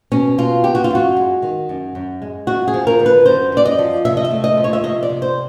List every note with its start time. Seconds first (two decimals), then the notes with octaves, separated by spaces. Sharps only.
0.12 B2 C#4
0.38 B2 F4
0.64 B3 G4
0.75 F#4
0.84 F4
0.91 F#2 F#4
1.16 G#3
1.42 D#3
1.69 F#2
1.95 F#2
2.22 G#3
2.47 F#2 F#4
2.68 G#4
2.74 F3
2.87 A#4
2.99 D3
3.06 B4
3.26 F#2 C5
3.52 F#2 D5
3.65 D#5
3.79 F3
4.05 C3 E5
4.17 D#5
4.25 E5
4.31 A3
4.44 D#5
4.57 F3
4.64 C#5
4.73 E5
4.83 C3 D#5
5.03 D5
5.09 C3
5.22 C5